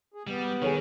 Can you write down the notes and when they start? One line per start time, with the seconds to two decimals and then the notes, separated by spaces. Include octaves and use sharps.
0.14 G#4
0.27 G3 B3
0.62 D#3 G#4 A4 C#5